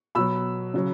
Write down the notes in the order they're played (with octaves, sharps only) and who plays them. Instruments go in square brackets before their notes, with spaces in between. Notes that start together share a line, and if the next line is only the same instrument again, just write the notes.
[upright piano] B2 F#3 B5 E6
C#3 F#3